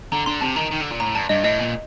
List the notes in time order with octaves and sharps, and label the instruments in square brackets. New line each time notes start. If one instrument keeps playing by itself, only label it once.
[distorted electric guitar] D3 [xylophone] A#5
[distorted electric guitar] D3 [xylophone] C6
[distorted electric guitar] C3 [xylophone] A5
[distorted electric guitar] D#3 [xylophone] A#5
[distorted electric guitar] D#3
D3
A#2
[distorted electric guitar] A2 [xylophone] A#5
[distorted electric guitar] G2 [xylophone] A5
[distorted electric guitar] G2 [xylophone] D#5
[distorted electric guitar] A2 [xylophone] D#5
[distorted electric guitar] A#2